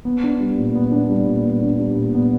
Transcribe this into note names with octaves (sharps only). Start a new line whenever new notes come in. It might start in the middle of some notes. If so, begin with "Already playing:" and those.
B3
D4
G3
A#2
B3
D4
G3
A#2
B3
D4
G3
A#2
B3